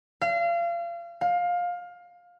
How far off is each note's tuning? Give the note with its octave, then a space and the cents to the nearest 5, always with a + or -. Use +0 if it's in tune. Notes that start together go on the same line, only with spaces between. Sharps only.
F5 -30
F5 +20